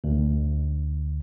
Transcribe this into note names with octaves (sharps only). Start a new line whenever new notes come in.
D2